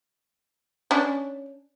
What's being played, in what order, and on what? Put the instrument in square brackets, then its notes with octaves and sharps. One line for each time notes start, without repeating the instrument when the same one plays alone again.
[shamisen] C#4 D4